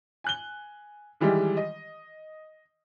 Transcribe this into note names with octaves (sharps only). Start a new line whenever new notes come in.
G#5 F#6 G7
D#3 E3 G3 G#3 G4
D#5